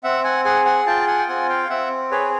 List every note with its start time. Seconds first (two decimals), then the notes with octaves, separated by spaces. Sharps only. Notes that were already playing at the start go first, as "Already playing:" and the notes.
0.04 C4 E5 F#5
0.24 F#5 G#5
0.44 G#4 F#5 G#5
0.65 F#5 G#5
0.87 F4 G5 A5
1.07 F#5 G#5
1.18 G5
1.28 C4 F#5 G#5
1.49 F5 G5
1.70 C4 E5 F#5
2.11 G#4 B4 C#5